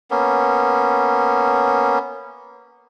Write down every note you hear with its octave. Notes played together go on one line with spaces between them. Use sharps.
A#3 B3 C#4